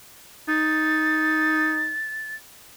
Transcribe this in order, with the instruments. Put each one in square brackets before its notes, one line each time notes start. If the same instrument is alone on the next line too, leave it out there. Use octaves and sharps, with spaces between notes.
[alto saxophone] D#4 [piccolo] A6